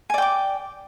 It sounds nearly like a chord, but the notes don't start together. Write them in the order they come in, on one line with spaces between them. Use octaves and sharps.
G#5 D5 G5 D6